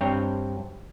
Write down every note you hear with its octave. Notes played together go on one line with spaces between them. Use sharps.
G2 C4 C#5 G5 A#5